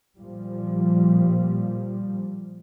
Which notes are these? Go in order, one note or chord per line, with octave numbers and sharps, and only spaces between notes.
A#2 F3 G3